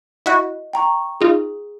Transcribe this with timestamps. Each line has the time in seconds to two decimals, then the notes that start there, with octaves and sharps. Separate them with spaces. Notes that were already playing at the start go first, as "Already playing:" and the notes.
0.26 E4 F#4 D#5
0.73 G5 A#5 C#6
1.21 D#4 F4 G#4